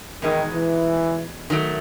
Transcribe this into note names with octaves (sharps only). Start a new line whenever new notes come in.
E2 B2 D#3 G#3 D#4
E3
D#3 F#3 A3